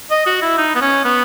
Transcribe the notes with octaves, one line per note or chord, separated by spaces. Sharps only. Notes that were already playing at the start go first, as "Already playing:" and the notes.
D#5
F#4
E4
D#4
B3
C#4
B3